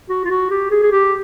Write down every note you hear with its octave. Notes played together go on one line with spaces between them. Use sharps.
F#4
F4
F#4
G4
G#4
G#4
G4